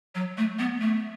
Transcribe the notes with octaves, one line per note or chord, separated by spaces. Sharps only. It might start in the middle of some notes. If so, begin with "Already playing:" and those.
F#3
A3
B3
A3